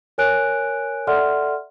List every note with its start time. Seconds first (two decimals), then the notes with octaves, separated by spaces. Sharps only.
0.18 A#4 C#5 G#5 F#6 D7
1.07 A4 D5 E5 F#5 C6 F6